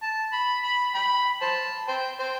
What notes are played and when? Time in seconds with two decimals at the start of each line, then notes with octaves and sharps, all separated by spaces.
0.02 A5
0.33 B5
0.64 B5
0.95 G5 B5
1.42 C5 A5
1.88 C5 G5
2.19 C5 G5